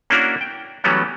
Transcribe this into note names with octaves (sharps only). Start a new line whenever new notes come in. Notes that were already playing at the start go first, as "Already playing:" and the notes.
A#3 C#4 D4 E4 F#4 A#4
G5
E3 F#3 G3 A3 B3 C#4